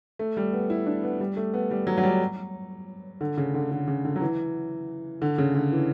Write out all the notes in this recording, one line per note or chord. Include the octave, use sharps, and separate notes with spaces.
A3
G3
B3
E4
D4
B3
G3
A3
B3
G3
F#3
F#3
G3
D3
C#3
D3
D3
C#3
D3
F#3
E3
D3
C#3
D3
E3